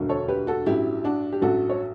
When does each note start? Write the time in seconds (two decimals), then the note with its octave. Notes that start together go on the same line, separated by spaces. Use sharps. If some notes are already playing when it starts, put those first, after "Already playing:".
Already playing: E1 D2 D3 F#3
0.09 A4 C#5
0.28 G4 B4
0.47 F#4 A4
0.66 A1 G2 F#3 E4 G4
1.04 D4 F#4
1.32 G4
1.41 A1 G2 F#3 F#4 A4
1.69 C#5